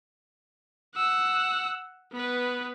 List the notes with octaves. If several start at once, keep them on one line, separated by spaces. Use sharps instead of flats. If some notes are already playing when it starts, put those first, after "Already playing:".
F#5 E6
B3 B4